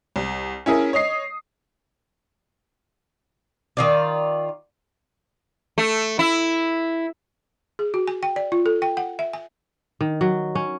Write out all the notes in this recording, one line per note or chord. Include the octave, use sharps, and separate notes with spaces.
C2
C#4 E4 G#4 A#4
C#5 D#5 D#6 C7
D#3 F4 D5
A3
E4
G#4
F#4
G#5
G5
D5
F4
A4
G5
F#5
E5
G#5
D#3
F#3
C#4